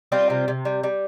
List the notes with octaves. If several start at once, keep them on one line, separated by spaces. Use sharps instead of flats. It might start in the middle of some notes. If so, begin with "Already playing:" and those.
G3 C4 F4
C3
C3
G3
G3